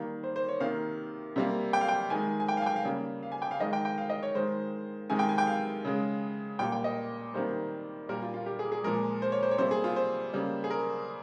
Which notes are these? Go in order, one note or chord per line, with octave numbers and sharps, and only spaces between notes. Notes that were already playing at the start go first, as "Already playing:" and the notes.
Already playing: D#3 G3 A#3
C5
C5
C#5
C3 D#3 A#3 F5
C3 G3 A#3
G5
F5
G5
D#3 G#3 G#5
G#5
G5
F5
G#5
G5
F5
C#3 G3 A#3
F5
G#5
G5
F5
D#3 G#3 D#5
G5
G5
F5
D#5
C#5
D#3 G#3 C5
C3 D#3 G#3 G#5
G5
G#5
G5
F5
C#3 G#3
A#2 G3 A#3 G5
G5
D#5
C3 D#3 G3 A#3 C5
A#2 G3 A#3 A#4
F4
F4
G4
G#4
G#4
A#2 F3 G#3 A#4
C5
C#5
C5
C#5
C3 G3 A#3 C5
G#4
F4
C5
C#3 G3 A#3
G#4
A#4